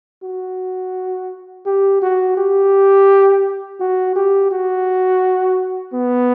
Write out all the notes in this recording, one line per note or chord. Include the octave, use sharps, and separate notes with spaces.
F#4
G4
F#4
G4
F#4
G4
F#4
B3